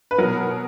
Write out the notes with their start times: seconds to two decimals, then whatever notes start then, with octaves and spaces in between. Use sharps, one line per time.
0.11 B4
0.18 B2 F#3 A#4